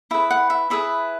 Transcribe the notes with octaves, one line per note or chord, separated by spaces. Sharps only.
E4 G#4 B4 E5
F#5
E5
E4 G#4 B4 E5